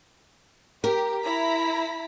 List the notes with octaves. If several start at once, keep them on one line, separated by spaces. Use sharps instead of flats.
G4 A#4
E4 A#5 B6